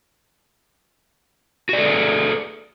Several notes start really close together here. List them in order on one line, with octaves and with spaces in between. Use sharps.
F#4 D5 A4 G#4